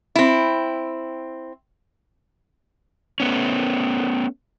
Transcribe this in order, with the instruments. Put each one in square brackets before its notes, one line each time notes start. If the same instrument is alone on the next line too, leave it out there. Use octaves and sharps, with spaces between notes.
[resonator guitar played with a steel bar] C4 E4
[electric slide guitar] A3 B3 C#4